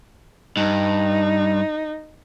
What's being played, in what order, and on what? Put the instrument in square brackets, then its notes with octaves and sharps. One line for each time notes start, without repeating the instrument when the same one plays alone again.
[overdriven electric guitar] G2 [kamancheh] D#4